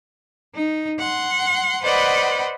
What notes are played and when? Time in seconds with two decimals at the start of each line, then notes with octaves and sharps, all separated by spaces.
0.54 D#4
0.99 F#5 C6
1.82 B4 C5 D5 D#5 F#5 B5